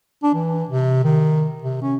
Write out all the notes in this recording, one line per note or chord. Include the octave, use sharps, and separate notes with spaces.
D4
E3
C3
D#3
C3
C#4